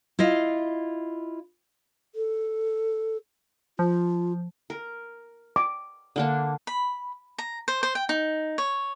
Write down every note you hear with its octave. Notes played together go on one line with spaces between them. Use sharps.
E4 F4 D#5 F5
A4
F3 F4
A#4
D6
D3 A#3 D4
B5
A#5
C5
C5
G5
D#4
C#5